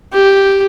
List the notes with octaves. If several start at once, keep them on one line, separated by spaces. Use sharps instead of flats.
G4